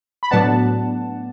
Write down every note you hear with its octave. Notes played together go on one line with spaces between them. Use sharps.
B5
A2 F#3 B3 D4 F#5 A5